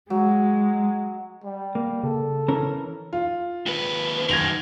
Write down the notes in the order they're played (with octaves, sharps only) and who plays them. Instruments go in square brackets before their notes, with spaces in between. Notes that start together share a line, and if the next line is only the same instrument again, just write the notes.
[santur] F#3 [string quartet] G#3
[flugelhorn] G3
[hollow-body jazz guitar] A#3
[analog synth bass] C#3 [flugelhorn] A4
[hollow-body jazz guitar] E3 C#4 A#4
[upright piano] F4
[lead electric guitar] D#2 B4
[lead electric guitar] F#2 D#3 [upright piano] G#6 A#6 F7